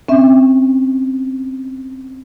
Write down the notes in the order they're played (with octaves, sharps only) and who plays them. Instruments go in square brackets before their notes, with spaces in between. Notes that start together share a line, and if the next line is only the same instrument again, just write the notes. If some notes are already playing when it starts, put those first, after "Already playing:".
[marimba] C4 C#4 E5